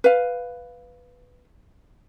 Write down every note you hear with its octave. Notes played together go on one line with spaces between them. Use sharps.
B4 F5